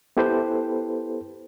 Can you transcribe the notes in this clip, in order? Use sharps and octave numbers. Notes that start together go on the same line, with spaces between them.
B3 E4 G4 A4 B4 C5